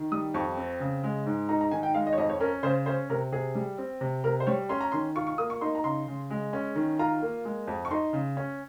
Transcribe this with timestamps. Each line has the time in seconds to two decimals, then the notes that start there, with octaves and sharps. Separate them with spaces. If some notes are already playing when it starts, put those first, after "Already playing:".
Already playing: D#3
0.12 G3 D#6
0.34 F2 C#6
0.57 C4
0.80 C#3
1.03 G#3
1.26 G#2
1.49 D#4 A#5
1.61 A#5
1.71 D#3 G#5
1.83 G5
1.94 G#3 F5
2.07 D#5
2.13 C#5
2.18 F2 D#5
2.30 C#5
2.40 C#4 A#4
2.63 C#3 C5
2.86 C#4 C5
3.09 C3 A#4
3.32 C3 G#4
3.55 G3
3.78 C4
4.01 C3
4.24 C3 A#4
4.40 C5
4.47 G3 C#5
4.69 C#4 C6
4.80 A#5
4.92 D#3 C6
5.15 F4 C#6
5.27 C#6
5.38 A#3 D#6
5.50 C#6
5.61 D#4 C6
5.75 A#5
5.84 C#3 C6
6.07 C#3
6.30 G#3
6.53 C#4
6.76 D#3
6.99 F4 A#5
7.22 A#3
7.45 G#3
7.67 F2
7.85 C#6
7.91 D#4 C6
8.13 C#3
8.37 C#4